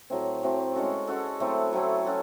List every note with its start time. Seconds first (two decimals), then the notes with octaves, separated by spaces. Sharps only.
0.10 A2 F#3 A3 C4
0.42 A2 F#3 A3 C4
0.75 G#3 C#4 F#4 A4
1.07 G#3 C#4 F#4 A4
1.40 F#3 A3 C4 E4
1.73 F#3 A3 C4 E4
2.05 C#4 F#4 A4